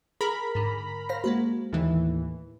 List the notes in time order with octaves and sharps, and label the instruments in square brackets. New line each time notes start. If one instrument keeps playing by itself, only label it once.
[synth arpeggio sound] G#4 [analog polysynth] A#4 A#5 B5
[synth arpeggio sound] G#2 D3
C5 F5 A#6
G#3 A#3 F#4
[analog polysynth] D#2 A2 E3